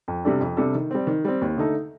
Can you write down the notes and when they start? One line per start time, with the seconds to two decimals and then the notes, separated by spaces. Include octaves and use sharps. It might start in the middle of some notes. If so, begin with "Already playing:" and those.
0.08 F2
0.25 C3 G3 D4 A4
0.41 F2
0.57 C3 G3 D4 A4
0.75 D#3
0.91 G3 C4
1.07 D#3
1.25 G3 C4
1.41 D#2
1.57 D3 A3 D#4 A4